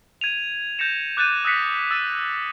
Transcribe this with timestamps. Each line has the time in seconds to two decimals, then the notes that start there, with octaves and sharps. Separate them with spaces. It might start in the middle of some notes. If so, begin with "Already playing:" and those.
0.21 G#6 D#7 F7
0.79 G6 A6 A#6 C#7 E7
1.17 D6 F#6 G6 A6 D#7
1.45 D#6 E6 F#6 A#6 B6 C#7
1.91 E6 A6 D#7